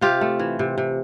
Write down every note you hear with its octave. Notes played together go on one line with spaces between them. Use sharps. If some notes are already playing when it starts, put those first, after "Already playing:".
C3 F4 G4
A3
E3
C3
C3